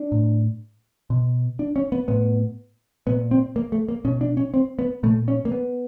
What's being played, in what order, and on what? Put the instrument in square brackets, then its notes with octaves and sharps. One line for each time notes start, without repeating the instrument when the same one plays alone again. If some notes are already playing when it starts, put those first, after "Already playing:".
Already playing: [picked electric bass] D4
A2
B2
D4
C#4
B3
A2 B3
A#2 B3
C4
A#3
A3
A#3
B2 C#4
D4
C#4
C4
B3
A#2 A3
C#4
A#3
B3